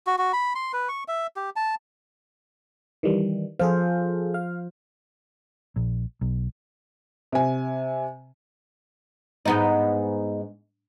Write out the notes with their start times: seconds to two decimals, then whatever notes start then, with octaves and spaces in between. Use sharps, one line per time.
0.07 F#4
0.18 F#4
0.33 B5
0.55 C6
0.73 B4
0.89 C#6
1.08 E5
1.36 G4
1.56 A5
3.03 D#3 E3 G3
3.59 F3 G#4 A4 C5 F5
4.34 F5
5.76 A#1
6.21 B1
7.32 C3 G#5
9.46 G#2 B3 D#4